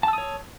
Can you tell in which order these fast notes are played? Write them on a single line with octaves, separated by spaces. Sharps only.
A5 E6 D#6 C#5